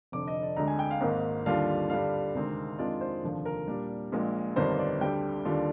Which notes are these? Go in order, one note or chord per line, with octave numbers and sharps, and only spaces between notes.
F1 F2 D3 D6
D#5
D5
D2 D3 G#3 A#5
G#5
G5
F5
G#1 G#2 D#3 A#3
D#2 D3 G3 D4 F4 F5
G2 D3 G3 F5
D2 C3 D#3 G#3 C4
F2 D#3 G#3 D4 F4 D5
C5
F1 D#2 D3 F3
A#4
A#2 G3 D4
A#1 A#2 G#3
G1 F2 D#3 G3 D4 C5
D5
D2 D3 G3 G5
D#2 D3 G3 D4 F4